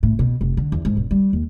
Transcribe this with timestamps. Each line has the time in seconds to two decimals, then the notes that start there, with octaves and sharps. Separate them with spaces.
0.03 A2
0.19 B2
0.41 F1
0.57 D3
0.72 E2
0.85 G#2
0.97 E1
1.11 G3
1.33 D#2